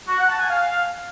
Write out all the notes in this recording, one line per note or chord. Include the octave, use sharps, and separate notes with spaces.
F#4
F#5
A5
G#5
F5